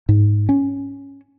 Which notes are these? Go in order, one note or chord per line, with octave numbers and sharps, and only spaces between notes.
G#2
C#4